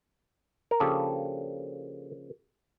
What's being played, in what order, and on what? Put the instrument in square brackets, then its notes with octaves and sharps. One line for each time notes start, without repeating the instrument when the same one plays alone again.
[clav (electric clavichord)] A#4
C#3 F3 A#3 D4 G4 A4